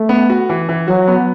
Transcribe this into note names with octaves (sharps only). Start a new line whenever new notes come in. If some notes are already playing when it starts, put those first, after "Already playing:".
Already playing: A3
B3
F#4
E3
E3
F#3 F#4
B3